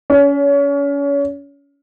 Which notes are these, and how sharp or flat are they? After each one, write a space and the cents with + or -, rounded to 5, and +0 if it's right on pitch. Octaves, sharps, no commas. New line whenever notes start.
C#4 +30